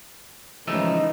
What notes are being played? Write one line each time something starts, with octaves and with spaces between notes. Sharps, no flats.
A2 C#3 E3 F3 G#3 A3 D#4 E6